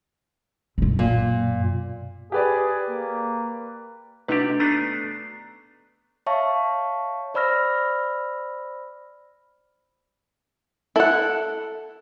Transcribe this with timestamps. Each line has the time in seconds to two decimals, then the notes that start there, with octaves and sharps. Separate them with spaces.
0.78 F#2 B2
0.99 A#2
2.32 G4 G#4 B4 D5
2.90 A#3
4.28 C3 A3 D4 D#4 F#4 G4 B4
4.60 A3 B3 D4 A#5 C7 D#7
6.26 C#5 E5 F5 A5 C#6
7.34 C5 D5 B5 E6 F6 A#6
10.96 E4 A4 F#5